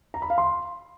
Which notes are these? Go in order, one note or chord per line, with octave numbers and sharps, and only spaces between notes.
A#5
B5
F5
C6